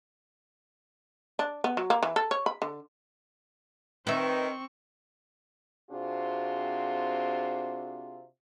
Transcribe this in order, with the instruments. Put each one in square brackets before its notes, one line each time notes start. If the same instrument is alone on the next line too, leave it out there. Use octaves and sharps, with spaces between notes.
[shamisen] D4
B3
F#3
A#3
E3
A4
C#5
B5
D3
[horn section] D#3 [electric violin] C4 C#6 [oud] B4 E5
[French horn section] C3 C4 D4 F4 F#4 G#4